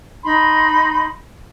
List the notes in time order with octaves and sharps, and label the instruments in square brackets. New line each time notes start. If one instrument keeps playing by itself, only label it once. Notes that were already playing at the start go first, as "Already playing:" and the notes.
[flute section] D#4 B5 C6